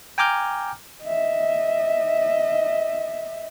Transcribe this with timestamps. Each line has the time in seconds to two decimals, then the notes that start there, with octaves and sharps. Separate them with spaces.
0.18 G5 G#5 A#5 D6 F6 G6
1.04 D#5 E5